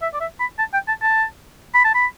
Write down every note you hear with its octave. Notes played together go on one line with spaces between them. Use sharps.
E5
D5
E5
B5
A5
G5
A5
A5
B5
A5
B5